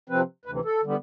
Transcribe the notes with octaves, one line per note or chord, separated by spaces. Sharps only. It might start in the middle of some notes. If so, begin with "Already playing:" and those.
C3 F3 C4 B4
D2 C3 E3 B4
A4
D3 G3 B3